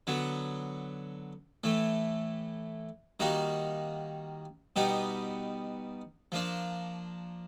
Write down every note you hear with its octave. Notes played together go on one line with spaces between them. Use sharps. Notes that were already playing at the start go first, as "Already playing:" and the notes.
D3 F#3 B3
A2 E3 A3
D#3 G3 A#3 D#4 F#4
B2 G3 B3 D#4 G4
F3 A#3 D4